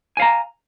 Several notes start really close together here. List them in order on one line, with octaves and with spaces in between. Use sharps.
G#5 F5 A#5